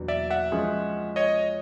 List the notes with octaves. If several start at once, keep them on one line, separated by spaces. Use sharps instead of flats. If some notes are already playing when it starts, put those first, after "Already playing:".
Already playing: E2 B2 F#3 A#3 D4
D5 E5
E5 F#5
F3 G#3 C#4 F4 G#4
C#5 D#5